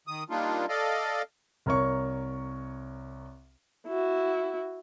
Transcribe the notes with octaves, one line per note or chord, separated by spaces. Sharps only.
D#3 D#6
G3 A#3 D4 D#4 F4
A4 D5 D#5 F5
C2 A#4 C#5 C#6
E4 F#4